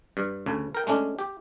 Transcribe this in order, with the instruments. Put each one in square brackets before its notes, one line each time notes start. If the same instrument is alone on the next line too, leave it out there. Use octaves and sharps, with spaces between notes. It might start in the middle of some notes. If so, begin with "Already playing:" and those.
[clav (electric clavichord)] G2
D2 C#3
A#4 G5
G#3 A3 C#4 D4
G4